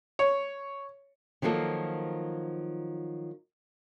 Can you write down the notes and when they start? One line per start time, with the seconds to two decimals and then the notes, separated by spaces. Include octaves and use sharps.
0.19 C#5
1.42 D#3 F3 F#3 A#3 A4